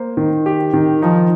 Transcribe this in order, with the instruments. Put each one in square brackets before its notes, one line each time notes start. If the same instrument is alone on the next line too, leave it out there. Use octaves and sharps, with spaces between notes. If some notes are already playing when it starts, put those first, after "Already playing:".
Already playing: [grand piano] A#3 C5
D#3
G4
D#3
[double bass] F3 [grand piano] D#4